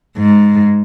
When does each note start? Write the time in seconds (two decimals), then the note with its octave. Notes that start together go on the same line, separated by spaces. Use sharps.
0.18 G#2